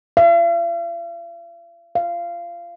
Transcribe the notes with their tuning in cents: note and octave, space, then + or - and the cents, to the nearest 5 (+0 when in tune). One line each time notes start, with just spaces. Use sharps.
F5 -45
F5 -20